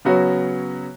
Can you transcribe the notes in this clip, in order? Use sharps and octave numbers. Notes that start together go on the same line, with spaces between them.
C#3 F#3 B3 F#4 C#5